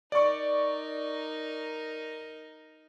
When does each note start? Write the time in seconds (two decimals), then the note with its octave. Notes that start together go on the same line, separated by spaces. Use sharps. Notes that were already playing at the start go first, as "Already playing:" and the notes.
0.12 D#4 A#4 D5 C#6